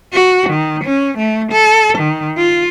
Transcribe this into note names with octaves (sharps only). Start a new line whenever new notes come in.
F#4
D#3
C#4
A3
A4
D#3
F4